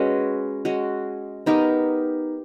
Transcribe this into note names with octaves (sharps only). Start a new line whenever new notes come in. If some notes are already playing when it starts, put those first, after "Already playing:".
Already playing: G#3 C#4 F#4 B4
G#3 C#4 F#4
B3 D#4 G4 A#4